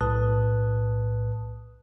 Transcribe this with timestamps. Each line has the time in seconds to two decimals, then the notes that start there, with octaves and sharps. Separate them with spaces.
0.01 B1 A2 B4 A5 D#6 F#6